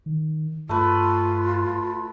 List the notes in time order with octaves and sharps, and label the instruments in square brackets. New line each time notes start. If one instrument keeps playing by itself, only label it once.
[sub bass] D#3
[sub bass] G2 [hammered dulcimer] A3 B4 [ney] F4